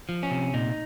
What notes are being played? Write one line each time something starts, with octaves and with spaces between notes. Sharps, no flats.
F3
C#4
C3
A#2 D#4